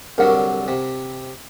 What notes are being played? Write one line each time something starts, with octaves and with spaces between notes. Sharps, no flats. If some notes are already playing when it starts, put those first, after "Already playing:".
C2 D3 F#3 A#4 F#5
C3